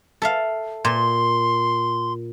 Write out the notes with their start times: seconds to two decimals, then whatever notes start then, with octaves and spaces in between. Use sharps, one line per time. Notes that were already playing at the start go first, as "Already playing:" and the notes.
0.22 A4 E5 F5
0.85 A#2 C6